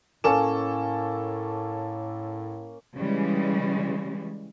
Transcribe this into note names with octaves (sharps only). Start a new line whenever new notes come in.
A2 A#3 C#4 A4 C#5 E7
C#3 E3 G3 G#3